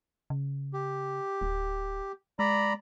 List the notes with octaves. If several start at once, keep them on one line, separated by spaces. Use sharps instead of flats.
C#3
G4
D1
G#3 D5 A#5 B5